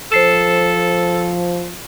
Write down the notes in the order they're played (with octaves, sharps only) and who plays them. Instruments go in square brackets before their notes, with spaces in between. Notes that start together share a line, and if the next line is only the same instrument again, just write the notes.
[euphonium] F3 [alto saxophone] A4 [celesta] C5 C7 E7